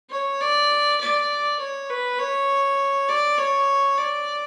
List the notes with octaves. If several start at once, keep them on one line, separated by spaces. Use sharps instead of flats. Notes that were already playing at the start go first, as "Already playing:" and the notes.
C#5
D5
D5
C#5
B4
C#5
D5
C#5
D5